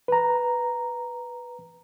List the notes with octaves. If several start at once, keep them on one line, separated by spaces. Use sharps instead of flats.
B4 A#5